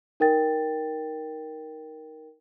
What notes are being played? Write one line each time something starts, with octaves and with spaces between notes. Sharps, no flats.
D#4 A#4 G5 A6